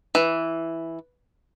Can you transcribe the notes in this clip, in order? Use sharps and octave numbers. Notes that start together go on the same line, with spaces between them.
E3